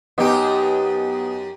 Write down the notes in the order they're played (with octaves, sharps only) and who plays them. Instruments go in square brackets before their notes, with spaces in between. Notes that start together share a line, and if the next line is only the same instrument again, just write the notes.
[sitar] F#2 D#4 G4 [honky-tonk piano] B3 D#5